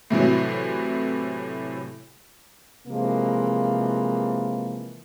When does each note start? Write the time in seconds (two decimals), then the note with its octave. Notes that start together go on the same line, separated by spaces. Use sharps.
0.10 A2 C3 E3 F#3
2.87 C3 E3 F3 G#3 A#3